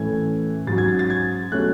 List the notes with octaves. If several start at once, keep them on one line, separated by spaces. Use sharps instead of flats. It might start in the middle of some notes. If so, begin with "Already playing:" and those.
Already playing: A2 E3 A3 C#4 G#6
G#2 F#3 C#4 A6
G#6
A6
A6
G#6
B2 F#3 A3 C#4 F#6